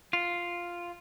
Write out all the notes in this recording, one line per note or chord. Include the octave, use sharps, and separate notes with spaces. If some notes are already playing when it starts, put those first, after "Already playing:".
F4